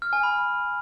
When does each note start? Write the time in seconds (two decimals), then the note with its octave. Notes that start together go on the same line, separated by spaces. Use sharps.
0.02 F6
0.13 G#5
0.23 B5